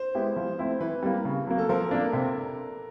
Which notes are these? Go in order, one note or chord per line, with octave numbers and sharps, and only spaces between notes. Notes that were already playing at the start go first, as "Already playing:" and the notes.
Already playing: C5
G#3 B3 E4 G4
F3
A3 C4 E4
E3 B4
G3 A#3
C#3
F#3 A#3
A4
F3 A#4
A#3 D4
C3